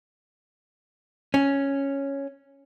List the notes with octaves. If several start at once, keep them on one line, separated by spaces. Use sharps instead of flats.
C#4